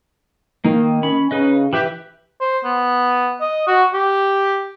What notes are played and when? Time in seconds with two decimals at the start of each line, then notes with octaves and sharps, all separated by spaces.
0.65 D#3 A#3 D#4
1.03 C#4 B5
1.31 C#3 D#4 B4 D#5
1.73 E3 G4 B4 E5
2.41 C5
2.65 B3
3.40 D#5
3.67 F#4
3.93 G4